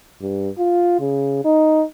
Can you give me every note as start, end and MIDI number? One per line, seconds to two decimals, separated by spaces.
0.21 0.50 43
0.59 1.00 65
1.00 1.42 49
1.45 1.83 63